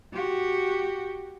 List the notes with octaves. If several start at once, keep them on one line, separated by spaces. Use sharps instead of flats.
F#4 G4